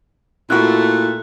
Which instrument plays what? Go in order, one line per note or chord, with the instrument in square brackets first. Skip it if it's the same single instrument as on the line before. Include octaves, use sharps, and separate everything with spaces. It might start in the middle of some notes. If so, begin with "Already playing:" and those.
[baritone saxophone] A#2 [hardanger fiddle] A3 [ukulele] E4 F#4 [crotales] F#6